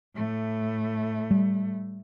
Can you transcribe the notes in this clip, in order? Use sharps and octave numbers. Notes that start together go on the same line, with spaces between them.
A2 A3
G3